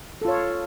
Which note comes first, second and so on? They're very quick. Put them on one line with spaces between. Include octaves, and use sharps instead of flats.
A4 F4 C#5